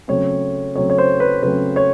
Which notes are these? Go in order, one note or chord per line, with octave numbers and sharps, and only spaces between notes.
C#3 F#3 A3 C4 C#5
C#3 F#3 A3 C4 C#5
C#5
C5
B4
C#3 F#3 A3 C4 B4
C#5